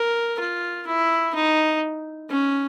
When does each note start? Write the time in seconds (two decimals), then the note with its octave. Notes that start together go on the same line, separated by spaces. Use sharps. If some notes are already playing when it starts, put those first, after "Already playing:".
Already playing: A#4
0.39 F4
0.87 E4
1.35 D#4
2.30 C#4